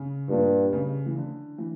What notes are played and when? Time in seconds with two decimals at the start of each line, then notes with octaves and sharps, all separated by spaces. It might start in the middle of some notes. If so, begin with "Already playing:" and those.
Already playing: C#3
0.29 G2 A#2
0.73 C#3
1.06 E3
1.16 D3
1.58 E3